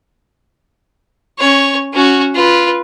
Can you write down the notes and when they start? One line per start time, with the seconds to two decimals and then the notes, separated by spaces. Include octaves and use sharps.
1.39 C#4 C#5
1.93 C#4 F#4
2.35 F4 B4